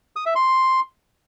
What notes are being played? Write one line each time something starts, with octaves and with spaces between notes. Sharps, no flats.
D#6
E5
C6